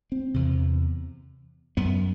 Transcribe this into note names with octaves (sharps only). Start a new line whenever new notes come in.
C4
E2 C3
F#2 B3